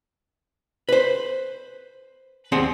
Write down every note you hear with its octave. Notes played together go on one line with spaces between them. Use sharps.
B4 C5
D#2 C4 G#4 F#5